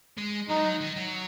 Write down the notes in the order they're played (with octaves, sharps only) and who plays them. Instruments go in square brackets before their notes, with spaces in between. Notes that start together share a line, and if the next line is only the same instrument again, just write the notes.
[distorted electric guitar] G#3
[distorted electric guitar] F#3 [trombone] D#4
[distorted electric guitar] G#3
F#3
D#3
F#3